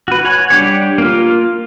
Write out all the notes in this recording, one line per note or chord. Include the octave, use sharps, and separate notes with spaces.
F#4 B4
C#5 F#5 G#5
G3 D4 G4 C#5
A#3 F4